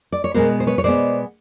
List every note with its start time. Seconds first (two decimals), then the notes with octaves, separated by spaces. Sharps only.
0.12 D5
0.24 C#5
0.34 B2 G#3 B3 A#4 C5
0.60 C5
0.67 B4 C#5
0.78 C#5
0.84 B2 G#3 B3 C5 D5